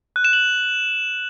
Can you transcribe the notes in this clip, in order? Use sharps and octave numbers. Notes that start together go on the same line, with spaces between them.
F#6
E7
F#7